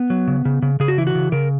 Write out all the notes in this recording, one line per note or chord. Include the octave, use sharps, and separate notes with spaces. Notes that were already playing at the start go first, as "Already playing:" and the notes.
Already playing: B3
F#3
C#3
C#3
C#3
C#3 G#4
F#4
E3 E4
F#4
C#3
C#3 A#4